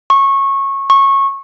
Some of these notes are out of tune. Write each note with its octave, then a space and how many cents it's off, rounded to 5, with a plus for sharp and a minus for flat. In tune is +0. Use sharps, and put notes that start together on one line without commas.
C#6 -20
C#6 -20